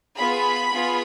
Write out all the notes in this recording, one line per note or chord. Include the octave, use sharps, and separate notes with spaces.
B3 F4 G#4 B5
B3 F4 G#4